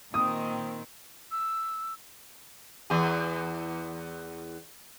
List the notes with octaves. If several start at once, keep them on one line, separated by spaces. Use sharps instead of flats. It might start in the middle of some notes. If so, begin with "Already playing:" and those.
A#2 D#3 C4 D#6
E6
E2 G#4